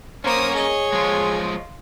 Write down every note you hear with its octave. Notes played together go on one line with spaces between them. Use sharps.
A#3 C#4 A#4 C5 C#5 D#6
G#4 D#5
F3 G#3 F4